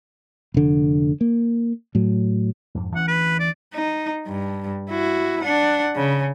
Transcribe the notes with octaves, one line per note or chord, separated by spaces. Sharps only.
F1 D3
A#3
A2 F#3
F2 G#2
D2 E3 C#4 F#5
B4
D5
D#4
G2
E4 F#4
D4 F#5
C#3